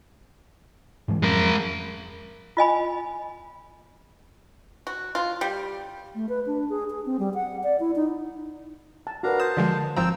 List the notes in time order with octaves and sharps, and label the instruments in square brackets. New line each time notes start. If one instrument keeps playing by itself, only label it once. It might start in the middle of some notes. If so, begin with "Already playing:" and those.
[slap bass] G#2 E3 G#3
[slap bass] F2 F#3 C#4 [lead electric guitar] G#3 A#4
[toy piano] F4 D#5 G#5 B5
[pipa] F#4
F4
G3
[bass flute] A3
B4
D4
G#4
G#4
C4
G3
F#5
D5
E4
D#4
[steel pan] A5
[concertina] D4 F5 A#5 [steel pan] F#4 A#4 B4
[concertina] C5 A5 [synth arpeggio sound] D#6 E7
[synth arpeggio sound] D3 F3 G#3
[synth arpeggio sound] G#1 F3 A#5 [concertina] C4 G5 E6 [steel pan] F5